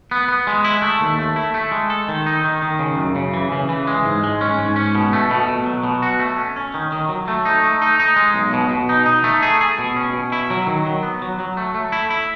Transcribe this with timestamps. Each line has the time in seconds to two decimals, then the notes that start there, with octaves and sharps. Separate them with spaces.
0.11 B3
0.28 B3
0.47 G#3
0.64 E4
0.82 A3
1.01 D#2
1.19 A3
1.36 E4
1.54 A3
1.72 G#3
1.90 A4
2.08 D#3
2.26 D#4
2.44 D#3
2.62 D#3
2.79 C#3
2.97 F#2
3.16 C#3
3.34 E3
3.52 C#3
3.69 E3
3.87 G#3
4.04 G#2
4.23 G#3
4.41 C#4
4.59 G#2
4.76 C#4
4.95 B2
5.13 A3
5.30 B2
5.48 B2
5.66 F#3
5.84 B2
6.02 F#4
6.19 A3
6.37 C#4
6.56 C#4
6.74 D#3
6.92 D#3
7.09 F#3
7.28 A3
7.45 D#4
7.64 A3
7.82 D#4
8.00 D#4
8.16 G#3
8.34 B1
8.53 B2
8.70 B2
8.89 D#4
9.06 D#4
9.24 A3
9.42 G#4
9.61 G#4
9.78 B2
9.96 C#4
10.13 B2
10.32 E4
10.50 F#3
10.67 D#3
10.86 F#3
11.03 B3
11.22 F#3
11.40 F#3
11.57 A3
11.75 A3
11.92 E4
12.10 E4